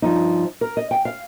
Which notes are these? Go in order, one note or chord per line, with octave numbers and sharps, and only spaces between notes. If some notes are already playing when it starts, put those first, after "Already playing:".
G2 F3 D#4
A#4
D#5
G5
F5